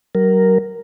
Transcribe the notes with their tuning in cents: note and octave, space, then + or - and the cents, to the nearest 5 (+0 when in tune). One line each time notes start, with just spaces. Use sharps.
F#3 +35 A#4 +0